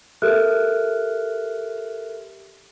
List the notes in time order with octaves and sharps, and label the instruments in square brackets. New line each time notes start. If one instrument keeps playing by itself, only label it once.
[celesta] G4 A4 A#4 E5 F6 F#6